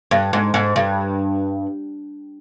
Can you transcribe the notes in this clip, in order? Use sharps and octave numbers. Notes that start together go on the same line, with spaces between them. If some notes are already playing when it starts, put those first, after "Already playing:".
G2
G#2
G#2
G2